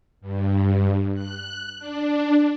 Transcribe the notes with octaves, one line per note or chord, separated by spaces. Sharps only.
G2
F#6
D4